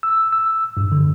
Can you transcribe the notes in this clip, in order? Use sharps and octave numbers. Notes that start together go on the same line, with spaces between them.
E6
E6
G2
D3